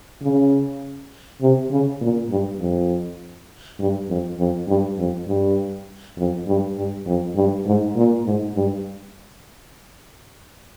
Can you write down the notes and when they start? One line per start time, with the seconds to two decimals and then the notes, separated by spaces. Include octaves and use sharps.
0.22 C#3
1.41 C3
1.71 C#3
2.01 A#2
2.30 G2
2.59 F2
3.79 G2
4.08 F2
4.38 F2
4.67 G2
4.97 F2
5.27 G2
6.17 F2
6.47 G2
6.76 G2
7.06 F2
7.35 G2
7.65 G#2
7.96 A#2
8.25 G#2
8.55 G2